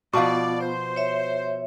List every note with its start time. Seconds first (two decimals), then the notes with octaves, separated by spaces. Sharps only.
0.13 B2 F3 B3 F4 D5 F5 A5 C#6
0.61 C5
0.96 C#5 E5